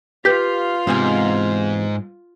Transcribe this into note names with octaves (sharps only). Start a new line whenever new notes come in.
F4 G4 B4 F5 G6 B6
E2 G#2 C3 G#5